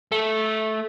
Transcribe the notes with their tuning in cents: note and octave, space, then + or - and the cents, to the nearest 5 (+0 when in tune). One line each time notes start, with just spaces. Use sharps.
A3 -10